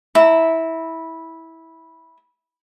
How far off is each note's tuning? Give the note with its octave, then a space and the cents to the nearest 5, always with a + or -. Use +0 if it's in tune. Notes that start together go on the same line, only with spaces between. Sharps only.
E4 -15 A#5 -35